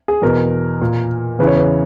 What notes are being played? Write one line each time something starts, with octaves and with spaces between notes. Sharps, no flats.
G#4
E2 B2 A#4
A#2
E2 C#3 E3 B4
C#5
B4